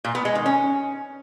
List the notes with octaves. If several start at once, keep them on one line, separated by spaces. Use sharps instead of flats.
A#2
B3
G#3
D#3
C#4